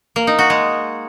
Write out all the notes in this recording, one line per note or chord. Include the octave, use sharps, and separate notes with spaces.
A#3
D#4
F#4
G#3